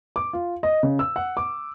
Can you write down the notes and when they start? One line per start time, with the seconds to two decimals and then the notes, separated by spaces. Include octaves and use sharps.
0.16 D6
0.33 F4
0.63 D#5
0.83 C#3
0.99 E6
1.16 F#5
1.37 D6